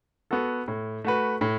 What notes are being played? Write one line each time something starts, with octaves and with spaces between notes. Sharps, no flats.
B3 F#4 A4
A2
A3 F#4 B4
A2